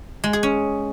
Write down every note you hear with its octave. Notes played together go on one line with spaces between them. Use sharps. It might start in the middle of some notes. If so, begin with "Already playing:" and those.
G#3
G#4
C#4